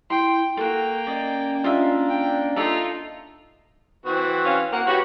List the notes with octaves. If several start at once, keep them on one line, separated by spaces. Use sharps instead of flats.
E4 G5 C6
A#3 F4 F#4 A4 G5
C#4 D5 D#5
A#3 D4 F4 D#5 E5
G5
D#4 F4 A4 D5 E5
E3 C4 F#4
C#4 F5
A#3 F#5
F#4 G4 B4 C#5